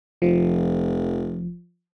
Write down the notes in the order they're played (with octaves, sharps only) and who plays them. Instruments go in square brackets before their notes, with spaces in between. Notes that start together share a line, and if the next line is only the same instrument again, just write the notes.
[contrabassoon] F1 [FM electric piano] F3